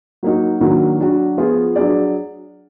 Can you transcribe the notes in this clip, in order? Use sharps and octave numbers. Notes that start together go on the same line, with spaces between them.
F#3 A#3 D#4 F#4
D#3 F#3 A#3 D4 F#4
F#3 D4 F#4
F3 B3 F4 G#4
F#3 D4 G#4 D5